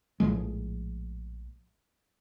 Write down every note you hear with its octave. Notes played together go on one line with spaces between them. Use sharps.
A#1 A2 F3 G#3